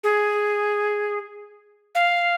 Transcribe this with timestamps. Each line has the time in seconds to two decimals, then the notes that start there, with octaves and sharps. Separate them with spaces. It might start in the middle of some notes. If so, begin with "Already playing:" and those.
0.04 G#4
1.95 F5